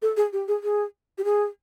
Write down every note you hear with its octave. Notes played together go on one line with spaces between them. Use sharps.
A4
G#4
G4
G#4
G#4
G4
G#4